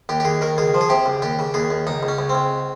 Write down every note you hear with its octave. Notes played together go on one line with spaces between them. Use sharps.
D#2 G4
G4
D#2 G#4
D#3 A#4
C#2 G#4
F3
G#4
C3 G4
C#2
D#2 G4
C#3
D#2 G#4
D#2
C#2 D#4
C#2
C#4
C#2
C4
C#2